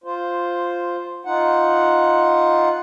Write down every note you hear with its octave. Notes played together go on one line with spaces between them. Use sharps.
F4 C5
D#4 F4 F#5